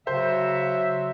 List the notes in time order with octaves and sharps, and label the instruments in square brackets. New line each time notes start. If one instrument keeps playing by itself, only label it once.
[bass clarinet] C#3 [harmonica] F#3 [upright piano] C5 [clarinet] E5